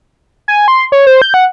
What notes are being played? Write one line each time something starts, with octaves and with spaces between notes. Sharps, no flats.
G#5
C6
C#5
C5
G6
F#5